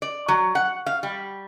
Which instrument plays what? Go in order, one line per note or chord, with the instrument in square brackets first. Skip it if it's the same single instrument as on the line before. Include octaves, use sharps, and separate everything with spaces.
[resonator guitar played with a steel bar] D5
F#3
F#5
F5
G3